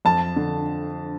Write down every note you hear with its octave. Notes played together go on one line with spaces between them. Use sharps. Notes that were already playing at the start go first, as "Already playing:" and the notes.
F2 A5
D3